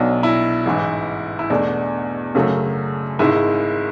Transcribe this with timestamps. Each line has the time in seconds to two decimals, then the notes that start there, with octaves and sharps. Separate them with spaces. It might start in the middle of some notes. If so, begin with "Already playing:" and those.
Already playing: B1 B2 F#3 D4
0.23 E4
0.66 A1 G#2 E3
1.39 E4
1.50 E2 B2 A3 D4
2.35 F#2 C#3 F#3 A3
3.19 G#1 G#2 G#3 E4